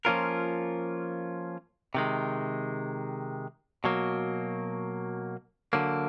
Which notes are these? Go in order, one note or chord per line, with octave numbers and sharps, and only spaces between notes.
F3 A#3 C#4 F4 A#4
C3 D#3 G#3
B2 F#3 A#3
D3 F#3 A#3